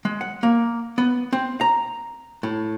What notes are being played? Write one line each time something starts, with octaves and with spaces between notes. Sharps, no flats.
G#3
F#5
A#3
B3
C4
A#5
A2